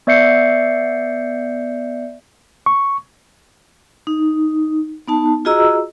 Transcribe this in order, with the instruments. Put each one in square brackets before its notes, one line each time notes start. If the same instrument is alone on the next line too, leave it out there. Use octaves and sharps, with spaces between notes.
[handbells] B3 D5 E5 G6 C7 C#7
[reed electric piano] C#6
[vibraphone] D#4
B3 D#4 A5
F4 F#4 G#4 D#5 A#5 E6